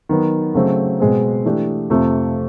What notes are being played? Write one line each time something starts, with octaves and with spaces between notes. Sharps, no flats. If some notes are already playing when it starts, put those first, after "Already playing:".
D#3 F#3 B3 D#4
C#3 F#3 A3 C4
B2 G#3 C4
E3 A3 D4 G4
F2 C3 F3 A3